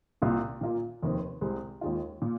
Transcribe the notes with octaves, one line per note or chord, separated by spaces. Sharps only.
C2 A#2 A#3 F4
A#2 A#3 F4
F1 D#2 D#3 C4
C2 C3 G#3 C4
D#2 D#3 G#3 F4
A#2